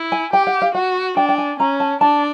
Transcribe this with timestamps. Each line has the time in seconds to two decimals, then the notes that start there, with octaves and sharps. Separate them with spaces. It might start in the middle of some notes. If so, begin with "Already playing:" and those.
Already playing: E4
0.12 G#5
0.33 G4 G5
0.47 F#5
0.62 F5
0.75 F#4 F#5
1.17 D4 G5
1.29 G5
1.38 G#5
1.59 C#4 A#5
1.80 A5
2.01 D4 A5